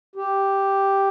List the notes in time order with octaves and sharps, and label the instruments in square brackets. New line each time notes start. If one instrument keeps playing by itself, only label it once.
[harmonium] G4